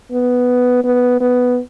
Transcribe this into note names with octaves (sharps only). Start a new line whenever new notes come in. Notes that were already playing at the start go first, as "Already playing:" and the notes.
B3
B3
B3